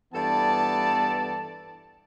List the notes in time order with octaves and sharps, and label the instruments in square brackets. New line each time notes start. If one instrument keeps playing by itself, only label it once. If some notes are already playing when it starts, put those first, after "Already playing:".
[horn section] G2 E3 B3 A4 D5 A5